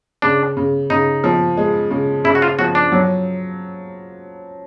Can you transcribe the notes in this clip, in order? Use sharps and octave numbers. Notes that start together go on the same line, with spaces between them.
C#3 D4
C#3
C#3 D#4
F3
G#3
C#3
C#3 E4
F#4
F4
F3 F#4
D4
F#3